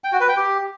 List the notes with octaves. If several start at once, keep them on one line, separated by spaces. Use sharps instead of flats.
G5
F#4
B4
G5
G4